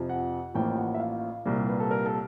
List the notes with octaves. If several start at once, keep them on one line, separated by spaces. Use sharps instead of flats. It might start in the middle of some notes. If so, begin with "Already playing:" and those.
Already playing: F2 C3 F3
F#5
A1 A2 F3 A#3 G5
F#5
E5
F5
C2 A#2 G3 A#3
B4
A4
A#4
A4